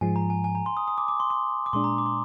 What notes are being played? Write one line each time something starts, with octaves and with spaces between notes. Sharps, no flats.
G#2 F3 G#3 G#5
A#5
G#5
G#5
A#5
C6
D#6
D#6
D6
D6
C6
C6
D6
A#2 G#3 D4 C6
A#5
D6
C6